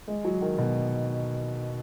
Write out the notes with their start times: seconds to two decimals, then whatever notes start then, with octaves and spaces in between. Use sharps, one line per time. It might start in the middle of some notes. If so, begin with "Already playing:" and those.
0.08 G#3
0.25 F#3
0.42 D#3
0.58 B2